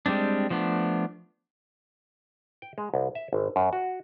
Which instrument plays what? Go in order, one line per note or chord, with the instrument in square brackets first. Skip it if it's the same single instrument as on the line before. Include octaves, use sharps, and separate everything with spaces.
[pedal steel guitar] G3 G#3 C4 D4
F3 A3 B3 D4
[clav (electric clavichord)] G5
G#3
C2
E5
G#1
F#2
F#4